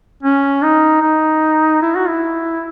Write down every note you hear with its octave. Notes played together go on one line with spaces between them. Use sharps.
C#4
D#4
D#4
E4
F#4
E4